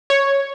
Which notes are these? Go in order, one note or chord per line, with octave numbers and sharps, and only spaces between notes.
C#5